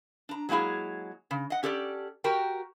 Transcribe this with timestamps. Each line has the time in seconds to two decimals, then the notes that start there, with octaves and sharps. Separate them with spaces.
0.29 D4 A#5
0.49 F#3 G#3 A#3 E4 G#4
1.31 C#3
1.50 D#5 F#5
1.63 C#4 G4 A4 B4 D5
2.24 F#4 G4 A#4 G5